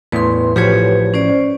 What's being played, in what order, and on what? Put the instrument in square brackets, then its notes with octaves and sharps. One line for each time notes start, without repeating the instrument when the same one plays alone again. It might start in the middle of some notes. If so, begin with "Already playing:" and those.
[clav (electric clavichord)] E2 A2 [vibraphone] B4 C6
[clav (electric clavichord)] A1 A2 F#4 [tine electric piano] F3 G#6 [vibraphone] G4 B4 C#5
[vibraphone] C#4 C5 D5